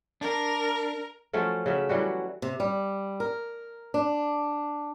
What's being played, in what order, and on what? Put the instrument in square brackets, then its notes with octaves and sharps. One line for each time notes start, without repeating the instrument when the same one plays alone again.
[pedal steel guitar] D4 [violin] A#4
[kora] F3 F#3 A3 C#4
C#3 F#3 E5
E3 F#3 G3 F#4
[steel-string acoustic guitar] C3
G3
A#4
D4